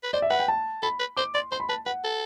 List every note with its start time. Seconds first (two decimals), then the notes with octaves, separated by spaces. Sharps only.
0.03 B4
0.13 C5 D5
0.22 E5
0.30 B4 F#5
0.40 G5
0.48 A5
0.83 A4 B5
0.99 B4
1.17 C5 D6
1.34 D5 C6
1.52 C5 C6
1.60 B5
1.69 B4 A5
1.86 B4 F#5
2.04 A4